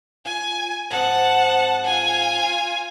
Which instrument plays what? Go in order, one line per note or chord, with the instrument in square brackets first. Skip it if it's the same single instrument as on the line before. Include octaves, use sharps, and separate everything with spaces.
[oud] F4 [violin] G#5
[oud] G#2 F3 C4 [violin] F#5 A5
[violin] F4 G#5